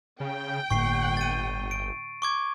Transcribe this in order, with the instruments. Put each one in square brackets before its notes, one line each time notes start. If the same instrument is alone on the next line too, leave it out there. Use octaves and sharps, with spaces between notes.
[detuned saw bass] C#3 [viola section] G5
[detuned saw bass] G1 [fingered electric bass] A2 D3 A#3 [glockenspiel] C#6 C7
[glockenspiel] A6 D#7
D7
C#6 D6 G#6